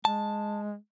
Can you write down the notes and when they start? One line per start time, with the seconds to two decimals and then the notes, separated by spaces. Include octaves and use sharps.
0.05 G#3 A5